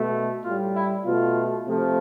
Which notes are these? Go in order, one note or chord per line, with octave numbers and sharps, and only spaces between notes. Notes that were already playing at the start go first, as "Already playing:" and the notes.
Already playing: B2 A3
A2 G3 F4
E4
B2 A3 F4
C3 F3 A3